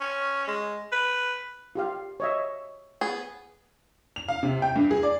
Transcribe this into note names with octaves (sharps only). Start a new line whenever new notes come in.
C#4
G#3
B4
F4 G4 F5
C#5 D#5 E5
B3 G#4
F7
F5
C3
G5
G2
G#4
D5